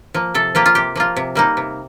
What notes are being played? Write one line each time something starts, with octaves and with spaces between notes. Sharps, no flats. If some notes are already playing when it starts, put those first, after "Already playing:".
F3 A#3
C3 A4
F3 A#3 F4 G4
F4
C3 G4
F3 A#3 F4
C3
G3 A#3 D#4
C3